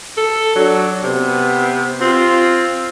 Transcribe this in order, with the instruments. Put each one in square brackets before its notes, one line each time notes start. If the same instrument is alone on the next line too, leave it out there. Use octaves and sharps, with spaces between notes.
[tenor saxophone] A4
[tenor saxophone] F#3 [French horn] D4
[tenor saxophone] C3 [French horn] B3
[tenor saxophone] C4 [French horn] F4